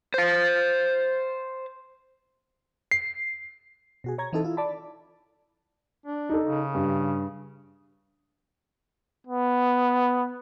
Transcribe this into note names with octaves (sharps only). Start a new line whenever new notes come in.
C5 F5
C7
B2 F#4 G#4
C#5 A#5 G#6
E3 C4 D#4 E4 A4
E4 F4
D5 A5 B5
D4
D#4 A4
C#3
G2
B3